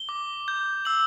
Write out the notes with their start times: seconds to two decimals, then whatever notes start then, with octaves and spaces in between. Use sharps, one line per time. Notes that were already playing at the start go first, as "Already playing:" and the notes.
Already playing: G7
0.09 D6
0.48 G6
0.85 E6 F#7